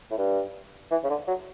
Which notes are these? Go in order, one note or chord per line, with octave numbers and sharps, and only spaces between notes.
A2
G2
E3
C#3
D3
F#3